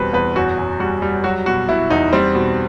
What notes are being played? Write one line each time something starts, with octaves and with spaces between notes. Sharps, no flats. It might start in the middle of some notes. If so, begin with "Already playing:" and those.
Already playing: E2 B2 G3 C4 B4
E2 B4
F#2 F#4
F#2
G3 F#4
G3
F#3 F#4
B2 F#4
B2 E4
E2 D#4
G3 C4
B2